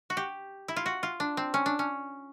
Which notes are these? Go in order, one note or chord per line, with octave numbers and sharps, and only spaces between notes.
F#4
G4
E4
F4
F#4
F4
D4
C4
C#4
D4
C#4